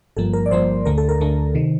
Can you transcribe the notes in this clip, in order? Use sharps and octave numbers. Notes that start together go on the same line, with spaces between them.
G1 G2 F3 A#3 A4
A#4
D5
G1 G2 F3 A#3 C5
D2 D3 A3 A#4
A4
A#4
D2 D3 A3
C3 D#3